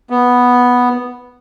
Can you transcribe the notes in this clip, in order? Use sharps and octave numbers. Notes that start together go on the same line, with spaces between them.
B3